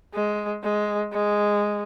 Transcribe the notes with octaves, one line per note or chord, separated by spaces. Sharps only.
G#3
G#3
G#3